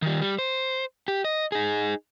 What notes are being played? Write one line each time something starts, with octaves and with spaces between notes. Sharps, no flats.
D#3 G3
G3
C5
G4
D#5
D#4 G#4